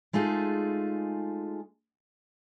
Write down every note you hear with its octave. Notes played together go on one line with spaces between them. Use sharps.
G#3 A3 D#4 F4 G#4